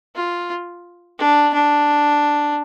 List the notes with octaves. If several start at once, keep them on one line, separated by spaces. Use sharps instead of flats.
F4
D4
D4